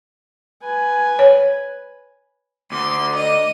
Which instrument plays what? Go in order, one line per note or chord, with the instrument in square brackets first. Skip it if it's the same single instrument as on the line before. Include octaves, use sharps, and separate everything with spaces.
[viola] B4 G#5
[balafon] C#5
[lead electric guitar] D2 [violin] C6 [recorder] D6
[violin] D#5 D#7